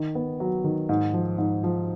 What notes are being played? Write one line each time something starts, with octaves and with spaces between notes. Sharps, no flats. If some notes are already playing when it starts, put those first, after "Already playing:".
Already playing: D#3
B3
F#3
D#3
G#2
F3
G#2
F3